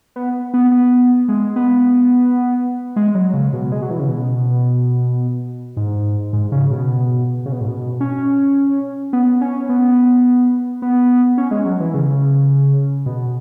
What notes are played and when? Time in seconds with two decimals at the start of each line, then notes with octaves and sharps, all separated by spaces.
0.16 B3
0.54 B3
0.71 B3
1.28 G#3
1.56 B3
2.96 G#3
3.15 F#3
3.34 C#3
3.53 B2
3.72 G#3
3.82 F#3
3.90 E3
4.00 C#3
4.09 B2
5.77 G#2
6.33 G#2
6.52 C#3
6.71 B2
7.46 C#3
7.52 B2
7.61 G#2
7.68 B2
8.01 C#4
9.13 B3
9.41 C#4
9.69 B3
10.82 B3
11.38 C#4
11.51 G#3
11.65 F#3
11.80 E3
11.94 C#3
13.06 B2